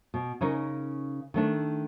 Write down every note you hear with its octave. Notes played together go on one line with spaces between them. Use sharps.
B2
C#3 C#4 D#4 A#4
D#3 A3 D4